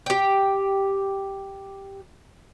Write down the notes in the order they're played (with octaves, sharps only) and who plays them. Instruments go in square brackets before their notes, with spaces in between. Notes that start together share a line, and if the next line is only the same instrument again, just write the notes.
[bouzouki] G4 G5